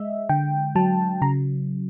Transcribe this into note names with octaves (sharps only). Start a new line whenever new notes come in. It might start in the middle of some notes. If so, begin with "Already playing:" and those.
Already playing: G#3 D#5 E5
D3 G5
F#3 A5
C#3 A#5